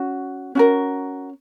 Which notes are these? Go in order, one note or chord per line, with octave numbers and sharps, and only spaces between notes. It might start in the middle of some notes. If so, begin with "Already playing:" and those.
Already playing: C#4 F#4
C#4 F#4 A#4